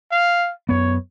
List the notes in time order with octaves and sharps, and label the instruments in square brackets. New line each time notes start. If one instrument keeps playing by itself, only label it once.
[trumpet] F5
[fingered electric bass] F#2 B3 [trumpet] C#5